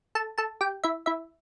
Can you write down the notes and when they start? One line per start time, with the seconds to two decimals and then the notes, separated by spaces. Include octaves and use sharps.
0.15 A4 A5
0.38 A4 A5
0.61 G4 G5
0.84 E4 E5
1.06 E4 E5